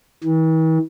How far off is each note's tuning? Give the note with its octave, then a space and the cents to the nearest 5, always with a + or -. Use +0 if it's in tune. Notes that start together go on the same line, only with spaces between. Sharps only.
E3 -45